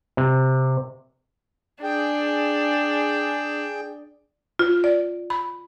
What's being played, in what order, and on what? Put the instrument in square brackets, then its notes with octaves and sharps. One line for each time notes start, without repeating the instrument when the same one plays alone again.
[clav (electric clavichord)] C3
[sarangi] D4 [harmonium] G#4 G5
[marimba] F4
D5
B5